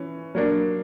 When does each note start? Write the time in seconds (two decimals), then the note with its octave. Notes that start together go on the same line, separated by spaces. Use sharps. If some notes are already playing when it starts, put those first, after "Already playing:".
Already playing: E3 C#4
0.35 F#3 A#3 D4